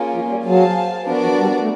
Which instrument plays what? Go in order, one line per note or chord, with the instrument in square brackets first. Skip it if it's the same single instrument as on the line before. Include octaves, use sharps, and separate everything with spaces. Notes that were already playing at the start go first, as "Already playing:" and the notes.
Already playing: [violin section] A#3 C#4 F4 G#4
[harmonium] F3
G3
[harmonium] F#3 [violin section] G#4 C5 F5 A5
[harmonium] F3 [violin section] B3 D4 F#4 A#4 D5
[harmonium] F3
G3
A3